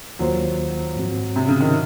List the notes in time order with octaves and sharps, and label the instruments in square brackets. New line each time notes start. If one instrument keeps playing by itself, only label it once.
[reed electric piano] D#2 D#3 A#3 F4 C5 [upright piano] F#3
[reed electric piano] G#2 F3 C4 F#4
[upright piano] C3
C#3
D#3